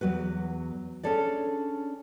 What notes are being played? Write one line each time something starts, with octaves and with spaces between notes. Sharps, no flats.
E2 F#3 F#4 B4
C#4 D4 G#4 A4 C#5 D5